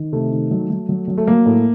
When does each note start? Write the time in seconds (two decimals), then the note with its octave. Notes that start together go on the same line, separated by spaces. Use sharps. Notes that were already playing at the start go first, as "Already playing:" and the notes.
Already playing: D#3
0.12 C3 A3
0.32 D#3
0.51 F#3
0.70 F#3
0.89 F#3
1.08 F#3
1.18 A3
1.27 F#3 A#3
1.46 A2